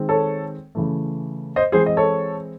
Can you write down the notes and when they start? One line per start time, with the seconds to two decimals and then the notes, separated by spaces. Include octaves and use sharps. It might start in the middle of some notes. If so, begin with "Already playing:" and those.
Already playing: D#3 G#3 C4
0.09 A4 C#5
0.75 C#3 E3 A3
1.56 C5 D#5
1.72 E3 G#3 C4 G#4 C5
1.86 D#5
1.97 A4 C#5